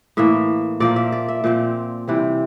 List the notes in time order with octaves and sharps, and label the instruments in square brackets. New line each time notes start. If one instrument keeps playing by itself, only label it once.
[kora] A2 E3 A#3 E5
A#2 F3 A#3 D5
E5
D5
E5
A#2 F3 C4 D5
C3 E3 G3 C4